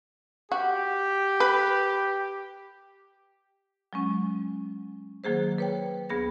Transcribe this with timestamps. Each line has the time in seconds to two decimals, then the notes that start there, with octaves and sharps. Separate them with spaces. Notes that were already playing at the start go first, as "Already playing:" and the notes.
0.52 F#4 G4
1.40 B4
3.93 F#3 G#3 C#4
5.24 D#3 F#3 A#3 G#4 C5
5.58 B4 C#5 G5
6.10 D2 B3 G#4 A#6